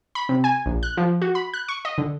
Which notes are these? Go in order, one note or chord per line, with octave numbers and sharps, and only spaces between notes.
B5
C3
G#5
A#1
F#6
F3
F#4
B5
F#6
C#6
D#5
D3